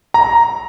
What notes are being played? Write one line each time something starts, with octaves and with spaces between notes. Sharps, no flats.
A#5